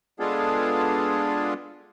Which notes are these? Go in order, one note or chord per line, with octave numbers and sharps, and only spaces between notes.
G#3 B3 D4 F4 G#4 A4